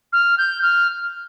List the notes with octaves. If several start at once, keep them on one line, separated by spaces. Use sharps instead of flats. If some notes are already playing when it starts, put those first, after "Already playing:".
F6
G6
F6